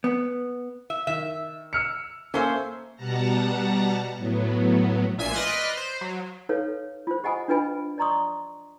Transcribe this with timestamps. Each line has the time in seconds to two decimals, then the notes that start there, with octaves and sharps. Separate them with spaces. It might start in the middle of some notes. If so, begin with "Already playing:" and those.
0.04 B3
0.90 E5
1.07 D#3 E5
1.73 E6 F6 C#7
2.34 A#3 C#4 A4 C5 E5 G#5
2.96 B2 G3 F#5 A5 A#5 A#6
4.17 A2 F#3 B3
5.18 A#1 A#2 E5 G#5 G#6 C7
5.33 B4 D5 D#5 C6 F6 F#6
5.77 C5
6.01 F#3
6.49 D#4 A4 B4 C#5 F5
7.07 F4 C5
7.24 G4 D#5 F#5 G#5 B5 D#6
7.48 D4 F4 B4 D#5 G#5 B5
7.98 D5 D#5 A#5 C6 C#6 D#6